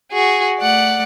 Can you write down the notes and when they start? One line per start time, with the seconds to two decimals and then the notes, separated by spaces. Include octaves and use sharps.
0.12 F#4 G#4
0.60 A3 D5 F#5